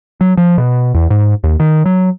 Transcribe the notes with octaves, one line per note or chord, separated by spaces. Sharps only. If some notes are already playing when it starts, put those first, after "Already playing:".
F#3
F3
B2
E2
G#2
D#2
D#3
F#3